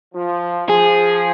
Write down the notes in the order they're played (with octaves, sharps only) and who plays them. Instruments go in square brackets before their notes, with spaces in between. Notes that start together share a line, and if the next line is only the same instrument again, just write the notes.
[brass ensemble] F3
[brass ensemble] F3 [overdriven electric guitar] G#4